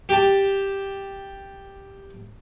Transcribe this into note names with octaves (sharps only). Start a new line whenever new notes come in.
G4 A5